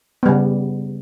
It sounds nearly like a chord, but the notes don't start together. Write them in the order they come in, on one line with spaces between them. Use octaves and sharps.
B3 G3 C#3